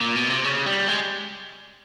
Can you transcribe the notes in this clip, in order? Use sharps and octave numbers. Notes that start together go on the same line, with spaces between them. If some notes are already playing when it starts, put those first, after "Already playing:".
A#2
B2
C3
C#3
G3
G#3